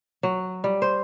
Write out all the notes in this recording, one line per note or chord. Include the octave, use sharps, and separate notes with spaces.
F#3
G3
C5